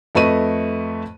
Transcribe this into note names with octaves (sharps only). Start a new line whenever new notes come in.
F2 A3 B4 D#5 C#6 D#7